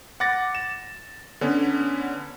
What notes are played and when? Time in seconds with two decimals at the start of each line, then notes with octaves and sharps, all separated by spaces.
0.20 F#5 D6 A6 A#6
0.55 E7
1.41 D3 B3 C#4